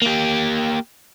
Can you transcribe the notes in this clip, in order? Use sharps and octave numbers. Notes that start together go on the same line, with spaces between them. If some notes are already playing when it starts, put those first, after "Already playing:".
A#3 G4